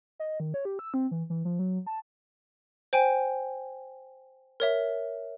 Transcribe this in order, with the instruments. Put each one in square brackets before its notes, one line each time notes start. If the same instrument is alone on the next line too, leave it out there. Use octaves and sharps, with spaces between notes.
[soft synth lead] D#5
D#3
C#5
G4
E6
C4
E3
E3
F3
F#3
A5
[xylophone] C5 G5 G#5
A#4 C#5 E5